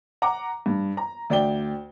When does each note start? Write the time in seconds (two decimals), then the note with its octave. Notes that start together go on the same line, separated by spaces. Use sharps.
0.22 F#5 A#5 D6
0.66 G2
0.97 A#5
1.30 D2 D5 G5 G7